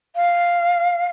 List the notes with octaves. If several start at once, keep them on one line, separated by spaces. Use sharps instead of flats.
F5